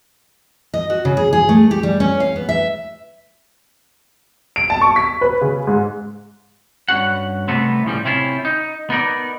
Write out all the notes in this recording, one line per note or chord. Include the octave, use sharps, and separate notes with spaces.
D#5
F#4
C#3
G#4
G#4
A3
G4
G3
C#4
F5
B3
E5
D7
A5
C#6
B6
B4
C#3
G#2
G2 C#4 F#4 F#5
C3 D#3 G3 A3 B3 C4
A2 C#3 F3 G3
C3 C4 C#4 E4 F4
D#4
B3 D#4 A#4 D5